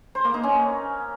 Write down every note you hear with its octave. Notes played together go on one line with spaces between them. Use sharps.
C5
A#3
D#4
C#4